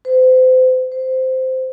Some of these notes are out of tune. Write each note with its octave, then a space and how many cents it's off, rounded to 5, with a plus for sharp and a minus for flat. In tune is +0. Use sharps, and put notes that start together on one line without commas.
C5 -35
C5 -10